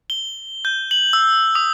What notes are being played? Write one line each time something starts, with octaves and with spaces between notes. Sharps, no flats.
G7
G6
F#7
E6
D#6